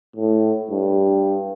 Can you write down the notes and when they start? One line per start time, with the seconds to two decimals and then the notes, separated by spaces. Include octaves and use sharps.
0.16 A2
0.71 G2